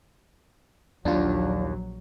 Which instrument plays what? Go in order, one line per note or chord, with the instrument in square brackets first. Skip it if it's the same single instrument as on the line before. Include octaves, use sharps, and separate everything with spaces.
[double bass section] A#1 F#3 [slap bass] D#2 [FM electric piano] D4 F4